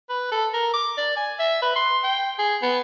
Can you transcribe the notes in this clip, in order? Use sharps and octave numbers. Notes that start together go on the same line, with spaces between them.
B4
A4
A#4
D6
D5
G#5
E5
B4
C6
G5
G#4
B3